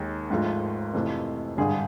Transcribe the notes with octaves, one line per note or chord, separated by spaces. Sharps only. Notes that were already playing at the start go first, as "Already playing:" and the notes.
Already playing: D#2 D#3 G#3
G#1 G#2 F3 A3
F2 C3 E3 A3
G#1 G2 D3 G3 G#4